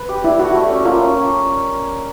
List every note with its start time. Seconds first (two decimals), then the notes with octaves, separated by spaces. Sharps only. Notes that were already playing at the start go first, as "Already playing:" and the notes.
Already playing: B4
0.09 G4
0.24 E4 D5
0.39 F#4 A4
0.55 A3
0.70 C#4
0.84 A#3 F4
1.00 C#4